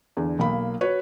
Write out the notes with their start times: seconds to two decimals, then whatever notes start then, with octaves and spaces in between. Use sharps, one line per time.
0.17 E2 D3
0.39 B1 A#3 B5
0.81 F#4 B4 C#5